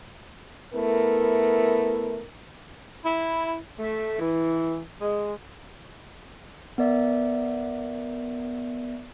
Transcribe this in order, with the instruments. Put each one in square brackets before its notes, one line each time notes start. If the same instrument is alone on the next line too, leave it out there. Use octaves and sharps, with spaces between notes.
[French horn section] A3 B3 E4 A#4
[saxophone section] E4
A3
E3
G#3
[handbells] B3 A#4 D5 E5